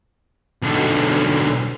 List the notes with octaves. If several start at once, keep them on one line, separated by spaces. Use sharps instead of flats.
B1 D3